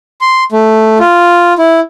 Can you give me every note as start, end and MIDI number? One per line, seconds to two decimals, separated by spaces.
0.21 0.44 84
0.52 0.98 57
0.99 1.53 65
1.58 1.80 64